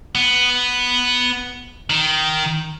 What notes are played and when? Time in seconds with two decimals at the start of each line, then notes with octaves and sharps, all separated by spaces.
0.15 B3
1.90 D#3